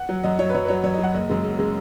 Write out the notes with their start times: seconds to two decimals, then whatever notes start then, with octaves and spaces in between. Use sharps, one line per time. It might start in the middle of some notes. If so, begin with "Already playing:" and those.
Already playing: F#5
0.09 F#3
0.23 F#2 D#5
0.39 F#3 C#5
0.49 B4
0.54 F#2 C#5
0.65 B4
0.68 F#3 C#5
0.83 F#2 C#5
0.94 D#5
0.98 F#3
1.03 F#5
1.14 F#1 D#5
1.30 F#2 C#3 G#3
1.44 F#1
1.59 C#3 G#3